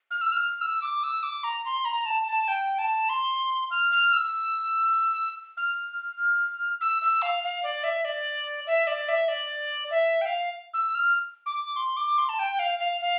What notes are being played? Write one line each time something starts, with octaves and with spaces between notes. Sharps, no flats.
F6
E6
F6
E6
D6
E6
D6
A#5
C6
A#5
A5
A5
G5
A5
C6
F6
F6
E6
F6
E6
E6
F5
F5
D5
E5
D5
E5
D5
E5
D5
E5
G5
F5
E6
F6
D6
C6
D6
C6
A5
G5
F5
F5
F5